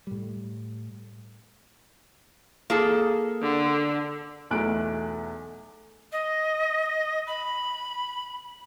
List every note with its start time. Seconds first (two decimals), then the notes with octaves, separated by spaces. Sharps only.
0.07 A2 G3
2.70 A#3 G#4 A4
3.42 D3
4.51 B1 E2 A3 F#6 D7
6.12 D#5
7.27 B5